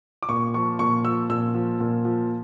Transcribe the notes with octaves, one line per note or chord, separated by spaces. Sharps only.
D6
A#2 C#6
F3 C#6
A#2 C#6
F3 E6
A#2 E6
F3
A#2
F3